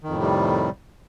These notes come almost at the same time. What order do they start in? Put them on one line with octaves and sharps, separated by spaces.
D#3 F2 A2 C3 G3